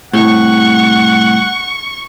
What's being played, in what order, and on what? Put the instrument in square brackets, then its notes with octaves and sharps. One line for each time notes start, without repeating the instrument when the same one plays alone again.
[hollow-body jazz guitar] C2 A2 [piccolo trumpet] F#5 [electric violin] C#6